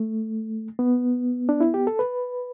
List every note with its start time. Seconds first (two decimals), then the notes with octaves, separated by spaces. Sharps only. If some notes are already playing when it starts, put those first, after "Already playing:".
Already playing: A3
0.79 B3
1.49 D4
1.60 E4
1.74 G4
1.87 A4
1.99 B4